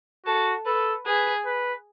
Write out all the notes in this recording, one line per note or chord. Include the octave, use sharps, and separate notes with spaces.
F#4 A4
A4 B4
G#4 B4
B4